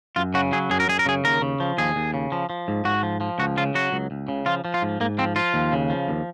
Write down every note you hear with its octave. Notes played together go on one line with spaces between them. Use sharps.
F#2 F4
C#3 F#4
F#3 G#4
F#2 G#4
A#4
F#2 G#4
A#4
C#3 G#4
D#2 A#4
C#3
F3
D#2 G#4
D#2
C#3
F3
F3
G#2
G#2 F#4
F3
F3
C#2 F#4
C#3 F4
F#3 F#4
C#2
C#2
C#3
F3 F4
F3
F4
G#2
G#2 A#3
F3 C4
F3 F4
D#2
C#3
F3
D#2